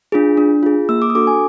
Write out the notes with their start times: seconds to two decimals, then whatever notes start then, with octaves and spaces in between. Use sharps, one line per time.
0.12 D4 F4 G#4
0.37 D4
0.63 F4 G#4
0.89 A#3 E6
1.02 D6
1.10 D#6
1.14 D4 F#4 A4 D6
1.27 G#5